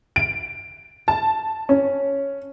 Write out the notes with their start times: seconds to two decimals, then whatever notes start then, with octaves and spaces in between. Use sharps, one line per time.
0.16 D7
1.08 A5
1.69 C#4